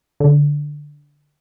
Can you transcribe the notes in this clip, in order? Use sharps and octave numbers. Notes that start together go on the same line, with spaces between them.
D3